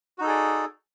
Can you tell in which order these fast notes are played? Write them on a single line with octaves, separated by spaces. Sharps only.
F#4 D#4 A4 G#4 D5